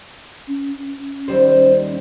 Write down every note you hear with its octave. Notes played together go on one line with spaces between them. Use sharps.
C#4
D#2 G3 C5